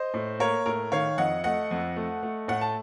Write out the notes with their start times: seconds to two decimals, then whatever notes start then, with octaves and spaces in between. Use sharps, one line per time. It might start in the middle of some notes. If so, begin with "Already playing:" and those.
Already playing: C5 D#5
0.14 A2
0.39 A#3 A#4 C#5
0.66 A2 A#4
0.92 D#3 C#5 F5
1.18 F2 D#5 F#5
1.44 A3 D#5 F#5
1.71 F2
1.96 A3
2.23 A3
2.48 A2 F#5
2.61 A5